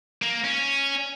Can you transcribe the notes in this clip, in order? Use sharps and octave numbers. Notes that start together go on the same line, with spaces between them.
A#3
C#4